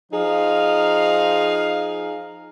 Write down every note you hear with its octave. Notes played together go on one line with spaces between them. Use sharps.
F3 D#4 G#4 F5